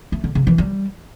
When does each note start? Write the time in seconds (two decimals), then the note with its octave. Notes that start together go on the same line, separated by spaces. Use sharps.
0.12 A3
0.24 D3
0.35 C#3
0.47 E3
0.58 G3